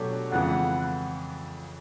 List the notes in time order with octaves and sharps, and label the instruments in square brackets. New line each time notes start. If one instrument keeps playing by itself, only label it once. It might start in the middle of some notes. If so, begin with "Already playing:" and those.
Already playing: [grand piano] B2 F#3 A3 D4 G4
[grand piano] F2 C#3 E3 G#3 B3 [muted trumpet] F#5